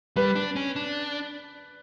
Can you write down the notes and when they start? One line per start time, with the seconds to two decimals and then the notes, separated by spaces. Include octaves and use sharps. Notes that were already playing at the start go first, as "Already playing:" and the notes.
0.16 G3 B4
0.35 D4
0.56 C#4
0.76 D4